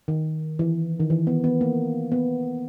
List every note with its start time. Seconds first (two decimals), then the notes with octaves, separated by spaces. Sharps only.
0.08 D#3
0.59 E3
1.00 D#3
1.10 E3
1.27 B3
1.44 B3
1.61 A#3
2.12 B3